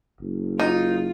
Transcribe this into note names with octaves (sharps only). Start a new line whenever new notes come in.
F#1
D#4 F4